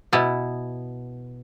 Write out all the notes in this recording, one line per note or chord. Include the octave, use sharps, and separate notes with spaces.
B2 B3 E4